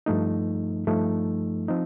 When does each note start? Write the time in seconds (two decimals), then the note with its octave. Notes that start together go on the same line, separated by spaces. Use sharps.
0.06 G2 F3 A3 D#4
0.87 G2 F3 A3 D#4
1.68 F3 C4 D#4